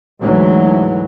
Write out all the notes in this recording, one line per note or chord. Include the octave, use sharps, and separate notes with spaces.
D2 G#2 E3 F#3